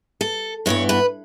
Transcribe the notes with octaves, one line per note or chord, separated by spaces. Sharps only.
A4
G2 E3 B3 C#5
B4